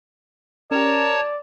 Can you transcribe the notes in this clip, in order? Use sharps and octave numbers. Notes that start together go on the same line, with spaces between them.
C#4 G4 A#4 C#5 D5 A5